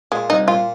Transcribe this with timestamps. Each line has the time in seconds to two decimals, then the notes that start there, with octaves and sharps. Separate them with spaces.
0.12 A#2 G#3
0.30 C2 D#4
0.48 A#2 F4